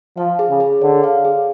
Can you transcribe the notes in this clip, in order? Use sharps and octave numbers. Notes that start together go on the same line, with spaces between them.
F3 F5
G#4
C#3
G#4
D3 C#5
F5
G#4